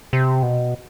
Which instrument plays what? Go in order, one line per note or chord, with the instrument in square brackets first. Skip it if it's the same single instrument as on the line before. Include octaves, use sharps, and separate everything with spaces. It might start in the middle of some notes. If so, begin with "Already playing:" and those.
[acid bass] C3
B2